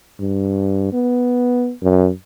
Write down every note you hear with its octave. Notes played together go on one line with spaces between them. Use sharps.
G2
B3
F#2